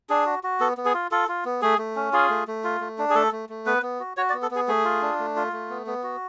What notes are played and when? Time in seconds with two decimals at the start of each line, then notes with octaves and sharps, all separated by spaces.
0.09 D4 G#4
0.26 F#4
0.43 F#4
0.60 B3 A4
0.77 B3
0.85 G#4
0.94 F4
1.11 F4 A4
1.29 F4
1.45 B3
1.62 A3 G#4
1.79 A3
1.96 C#4
2.13 F4 G#4
2.30 A3
2.48 A3
2.64 F4
2.81 A3
2.98 D4
3.10 G#4
3.15 A3 A4
3.32 A3
3.49 A3
3.66 B3 B4
3.82 B3
4.00 F#4
4.17 F#4 C#5
4.30 D5
4.34 B3
4.42 A4
4.51 B3 G#4
4.68 A3 G#4
4.85 F4
5.02 D4
5.19 A3
5.36 F4
5.53 A3
5.70 B3
5.87 B3
6.03 F#4